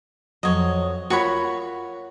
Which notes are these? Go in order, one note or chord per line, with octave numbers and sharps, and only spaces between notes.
F2 F#3 C#5 D#5
F4 F#4 A#4 C#5 B5